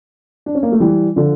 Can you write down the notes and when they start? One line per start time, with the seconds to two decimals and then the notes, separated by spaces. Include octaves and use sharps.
0.46 D4
0.55 C#4
0.63 A#3
0.72 A3
0.80 E3 G3
1.16 D3 F3